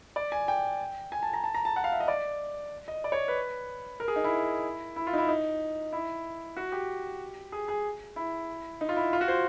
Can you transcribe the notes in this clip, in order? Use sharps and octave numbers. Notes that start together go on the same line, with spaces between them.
D5
G#5
G5
G#5
A5
A#5
A5
A#5
A5
F#5
F5
E5
D#5
D5
D#5
D5
C#5
B4
A#4
G#4
D#4
E4
E4
F4
D#4
E4
D#4
E4
F#4
G4
G#4
G#4
E4
D#4
F4
E4
F4
F#4
C5